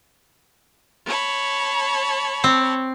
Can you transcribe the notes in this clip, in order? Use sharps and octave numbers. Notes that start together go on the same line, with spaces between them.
C#5 A5 B5
C4